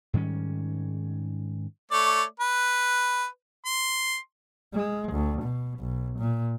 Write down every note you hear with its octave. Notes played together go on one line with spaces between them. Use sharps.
G#2 D#3 G3 C#4
A3 C#5 D5
B4
C6
G#3
D2
B2
B1
A#2